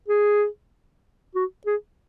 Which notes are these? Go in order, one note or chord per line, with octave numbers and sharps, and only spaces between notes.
G#4
F#4
G#4